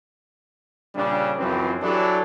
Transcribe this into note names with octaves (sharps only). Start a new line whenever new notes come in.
A#2 C#3 G3 D4
C#2 F#2 E3 F3 C4 B4
E3 F#3 D4 G4 A4 B4